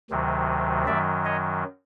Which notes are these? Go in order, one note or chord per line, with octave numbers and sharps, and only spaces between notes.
D2 C3 D#3 F#3
F#2 D#3 F#3 D5 E5
C#5 D#5